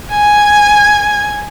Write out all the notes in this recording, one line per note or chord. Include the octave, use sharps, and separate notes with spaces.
G#5 G#6